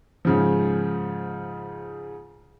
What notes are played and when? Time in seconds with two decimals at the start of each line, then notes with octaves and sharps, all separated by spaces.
0.25 G#2 C#3 F3